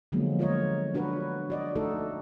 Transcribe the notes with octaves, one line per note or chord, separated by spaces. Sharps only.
D3 F3 F#3 G#3 A#3 B3
F4 A#4 C#5 D#5
D4 F#4 A#4 B4 C#5
F#4 D5 D#5
A3 D#4 F#4 A4